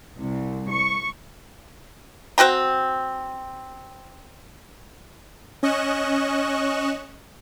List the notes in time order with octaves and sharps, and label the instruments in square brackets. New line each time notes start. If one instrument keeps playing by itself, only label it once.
[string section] C2
C#6
[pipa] C4 F#4 G5 A#5
[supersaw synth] C#4 D#5 C#6 F#6 E7